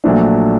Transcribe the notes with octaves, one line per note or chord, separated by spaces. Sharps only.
A#1 A#2 F#3 A3 D4